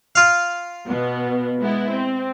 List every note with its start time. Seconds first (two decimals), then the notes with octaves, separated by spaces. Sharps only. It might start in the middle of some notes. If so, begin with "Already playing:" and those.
0.15 F4 F5
0.87 B2 B3
1.60 G#3 B3 E4
1.91 C4